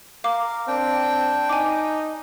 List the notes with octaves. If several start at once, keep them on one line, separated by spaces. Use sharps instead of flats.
A#4 F5 D6
C4 D4 G5
D#4 G#5 D6